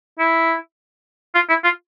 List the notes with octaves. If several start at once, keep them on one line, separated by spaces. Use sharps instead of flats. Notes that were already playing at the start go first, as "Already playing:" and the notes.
E4
F4
E4
F4